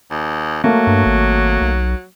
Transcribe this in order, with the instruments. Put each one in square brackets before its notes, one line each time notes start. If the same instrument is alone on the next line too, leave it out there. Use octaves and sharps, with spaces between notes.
[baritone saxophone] D#2
[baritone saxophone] F#3 [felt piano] A3 A#3
[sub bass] G2
G#1
B1